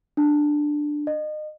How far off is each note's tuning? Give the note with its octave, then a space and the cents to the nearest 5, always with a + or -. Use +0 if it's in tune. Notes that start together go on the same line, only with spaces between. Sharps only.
D4 +10
D#5 -30